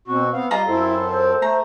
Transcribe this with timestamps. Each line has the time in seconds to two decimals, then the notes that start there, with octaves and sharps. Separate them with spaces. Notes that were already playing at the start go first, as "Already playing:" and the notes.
0.08 B2 C4 F#4
0.34 B3 C4 F5
0.51 G3 F4 D#5 A#5 C6
0.68 F#2 C4 E4 A4
1.08 C5
1.42 A3 A#5